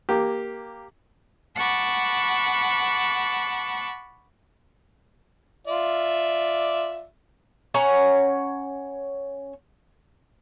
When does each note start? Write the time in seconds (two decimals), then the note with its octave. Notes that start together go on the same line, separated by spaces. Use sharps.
0.09 A#3 G4
1.56 F#5 A5 B5 C#6 D6
5.67 F4 D5 E5
7.74 C#4 C#5 F#5 A#5